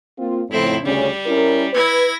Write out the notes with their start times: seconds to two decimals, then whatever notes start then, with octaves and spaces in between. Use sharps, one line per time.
0.18 A#3 C4 F4
0.51 F2 A2 C#3 C4 E4
0.84 D2 C#3 G3 C#4
1.26 C#4 E4 A#4
1.73 E4 B4 G#6 A#6